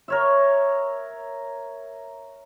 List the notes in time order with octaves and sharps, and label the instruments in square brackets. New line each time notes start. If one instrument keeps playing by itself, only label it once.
[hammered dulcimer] A#4 C#5 E5